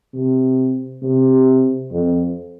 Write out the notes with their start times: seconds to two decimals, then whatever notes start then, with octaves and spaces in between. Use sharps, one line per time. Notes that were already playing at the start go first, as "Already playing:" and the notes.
0.14 C3
1.02 C3
1.92 F2